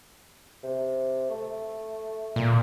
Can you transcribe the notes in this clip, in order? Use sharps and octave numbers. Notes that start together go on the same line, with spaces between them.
C3
A3
A#2